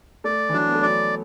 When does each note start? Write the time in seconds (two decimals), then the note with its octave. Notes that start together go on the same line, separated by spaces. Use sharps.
0.24 A3 D5
0.49 E3
0.53 F#3 D4
0.67 B3
0.75 A3
0.82 F#3 D5